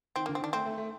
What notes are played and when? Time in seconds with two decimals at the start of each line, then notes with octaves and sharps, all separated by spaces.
0.16 D#3 C4
0.26 D3 A#3
0.35 C4
0.41 D#3 D4
0.53 A3 C4
0.66 A3
0.78 A3